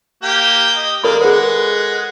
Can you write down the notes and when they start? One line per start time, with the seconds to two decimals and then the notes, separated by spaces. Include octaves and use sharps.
0.23 A#3 G4 G5
0.77 D#5
1.04 G#3 A#3 A4 A#4 D5 B5
1.21 G#3 G#4 B4 F#5